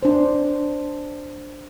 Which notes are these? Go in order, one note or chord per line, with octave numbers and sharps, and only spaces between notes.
D4 C5